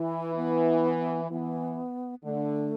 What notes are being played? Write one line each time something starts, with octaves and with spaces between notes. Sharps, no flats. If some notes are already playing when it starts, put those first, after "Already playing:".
Already playing: E3 E4
B3
E3 B3
D3 A3